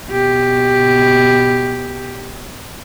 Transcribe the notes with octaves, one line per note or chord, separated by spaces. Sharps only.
B2 G4